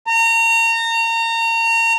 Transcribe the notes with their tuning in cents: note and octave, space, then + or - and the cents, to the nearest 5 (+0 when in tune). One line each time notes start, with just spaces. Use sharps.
A#5 -30